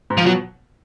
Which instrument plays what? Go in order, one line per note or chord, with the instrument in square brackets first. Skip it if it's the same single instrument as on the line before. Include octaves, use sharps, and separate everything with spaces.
[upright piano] G#2
[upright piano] A#2 [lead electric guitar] F3
[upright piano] B2 [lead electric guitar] F#3